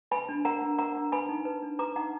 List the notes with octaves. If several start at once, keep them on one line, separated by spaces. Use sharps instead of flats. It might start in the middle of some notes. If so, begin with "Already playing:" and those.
B4 G#5 B5
D4
A#4 F#5 A#5
D4
A#4 F#5 A#5
D4
B4 G#5 B5
D#4
B4
D4
B4 A#5 D6
D#4 F#5 A#5